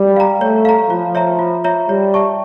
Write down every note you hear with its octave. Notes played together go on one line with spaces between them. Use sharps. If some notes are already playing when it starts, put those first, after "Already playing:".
Already playing: G3
F5 A#5
A3 C#5
F5 A#5
F3 F4
C#5 E5 A#5
F4
C#5 E5 A#5
G3 C#5
E5 A5 C#6